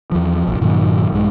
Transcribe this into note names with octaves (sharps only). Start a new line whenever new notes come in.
E2 F3
E1 A#1
G2 A#2 D#3 F#3
A#1 G2 G#3